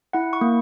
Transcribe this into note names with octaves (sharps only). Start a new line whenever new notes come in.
E4 F#5
C#6
A#3